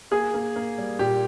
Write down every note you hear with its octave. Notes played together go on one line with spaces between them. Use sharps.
A#3 G#4
A#3
A#3
G3
A#2 G4